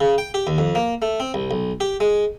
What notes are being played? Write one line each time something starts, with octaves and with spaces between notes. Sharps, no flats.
C#3
G5
G4
D#2
F2
A#3
A3
C4
C2
B1
G4
G#3